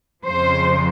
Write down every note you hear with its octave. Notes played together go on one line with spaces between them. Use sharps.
F2 C#3 F3 C5